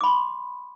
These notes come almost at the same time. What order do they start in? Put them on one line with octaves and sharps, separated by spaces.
D6 B5 C6